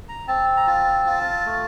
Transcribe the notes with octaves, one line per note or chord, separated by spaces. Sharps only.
A#5
C4 A5
A#5
F4 A5
F4
A3